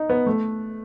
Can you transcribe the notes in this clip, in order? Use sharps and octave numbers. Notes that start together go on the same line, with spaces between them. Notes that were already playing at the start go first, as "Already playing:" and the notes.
Already playing: D#4
B3
A3